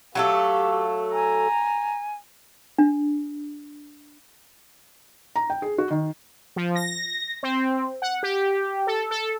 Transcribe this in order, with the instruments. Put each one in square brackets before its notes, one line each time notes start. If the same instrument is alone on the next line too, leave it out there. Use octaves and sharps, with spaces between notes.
[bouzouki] F#3 A3 A4 [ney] G4 [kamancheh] F5
[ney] G#5 [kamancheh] A#5
[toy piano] D4
[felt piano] A#5
G5
G#4
F#4
D#3
[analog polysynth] F3
A#6
C4
F#5
G4
A4
A4